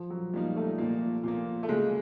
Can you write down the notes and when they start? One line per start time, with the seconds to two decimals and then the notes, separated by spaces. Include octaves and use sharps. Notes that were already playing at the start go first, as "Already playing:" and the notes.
Already playing: F3
0.10 F#3
0.33 F3 G3 A#3 D#4
0.56 A3
0.78 A#2 F3 A#3
1.23 A#2 F3 A#3
1.63 A3
1.68 C#3 F#3 G#3 A#3